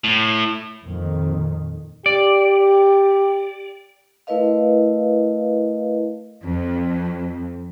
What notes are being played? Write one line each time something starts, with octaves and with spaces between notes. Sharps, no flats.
A2
F2 A#2 D#3
G4 D5
A3 E4 A#4 B4 D#5 F5
F2